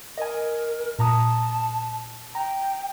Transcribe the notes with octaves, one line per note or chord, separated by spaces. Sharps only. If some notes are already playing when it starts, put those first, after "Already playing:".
A#4 D#5 G#5
A#2 A5 A#5 D#6
G5 A#5